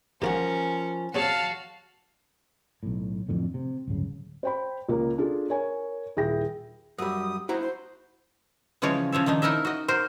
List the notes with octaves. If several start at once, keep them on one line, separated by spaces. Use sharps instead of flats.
B2 F3 C#4 F4 F#4 A#4
C4 C#4 F#4 G#4 F5 A5
B1 A2
F2 A2 D3
C3
D1 G1 C#3
C5 G5 B5
C#2 A#3 A#4
D4 F4 G#4 A4
A#4 C#5 G#5
D#1 E4 G#4 E5 G5 A#6
F#2 G3 D#6
E4 F#4 C5 A#5
C5
C#3 E3 F3 G#3 C#5
C#3 F3 C#5 E5
D#3 F3 D4 D#4
D#4 E4 A#4 D#5 E5
F#4 D#5
F#4 A#4 C5